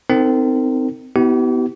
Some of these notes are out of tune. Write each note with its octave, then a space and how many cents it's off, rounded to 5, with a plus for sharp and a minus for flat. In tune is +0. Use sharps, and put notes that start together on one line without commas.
C4 -20 D#4 +0 A#4 -40
B3 +15 E4 -35 G4 -40